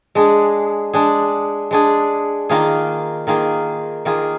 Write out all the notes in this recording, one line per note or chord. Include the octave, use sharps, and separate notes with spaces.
G#3 D4 G#4
G#3 D4 G#4
G#3 D4 G#4
D#3 A#3 F4 G#4
D#3 A#3 F4 G#4
D#3 A#3 F4 G#4